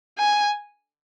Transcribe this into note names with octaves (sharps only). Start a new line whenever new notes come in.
G#5